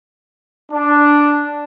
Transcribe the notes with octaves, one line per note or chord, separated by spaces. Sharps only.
D4